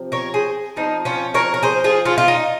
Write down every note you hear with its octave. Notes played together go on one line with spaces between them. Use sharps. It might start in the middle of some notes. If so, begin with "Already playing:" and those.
Already playing: C3 F3 C4
A#4 C#5
G#4 C5
F3 C4 D#4
C#4 F4
A#4 C#5
A#4
G#4 C5
F4 G#4
C#4 F4
F4
D#4